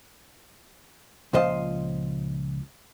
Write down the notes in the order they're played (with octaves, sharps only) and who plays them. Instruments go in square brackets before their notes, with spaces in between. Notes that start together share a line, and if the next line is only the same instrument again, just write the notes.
[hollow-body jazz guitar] C#2 A#2 F3 C5 D#5 F5